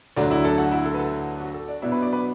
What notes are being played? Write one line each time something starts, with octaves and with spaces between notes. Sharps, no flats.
D2 D3 F#3 D4 D5
E4 E5
A4 A5
F#4 F#5
E4 E5
A4
B4
A4
F#4
A4
D4 D5
B2 F#3 B3 D4 E4 E5
B4 B5
D5 D6
B4 B5